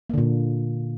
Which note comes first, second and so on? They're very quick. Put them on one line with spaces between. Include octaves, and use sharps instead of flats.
A#3 D3 A#2